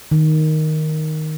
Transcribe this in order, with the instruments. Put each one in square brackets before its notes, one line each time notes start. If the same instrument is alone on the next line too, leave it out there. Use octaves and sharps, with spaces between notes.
[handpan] D#3